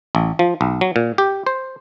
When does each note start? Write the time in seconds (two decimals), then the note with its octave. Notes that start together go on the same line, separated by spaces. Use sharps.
0.15 A1
0.39 F3
0.61 B1
0.81 F#3
0.96 A#2
1.18 G4
1.47 C5